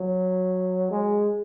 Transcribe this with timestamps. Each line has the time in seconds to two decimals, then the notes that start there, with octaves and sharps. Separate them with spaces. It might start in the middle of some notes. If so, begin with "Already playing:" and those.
Already playing: F#3
0.91 G#3